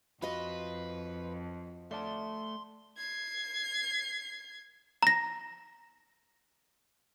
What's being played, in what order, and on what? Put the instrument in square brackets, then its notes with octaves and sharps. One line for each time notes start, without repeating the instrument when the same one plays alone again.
[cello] F2 [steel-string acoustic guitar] F4 F#4 D#5 [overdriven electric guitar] B4
[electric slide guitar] A3 D5 A5 [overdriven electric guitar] C6
[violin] G#6 C7
[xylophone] A#5 A#6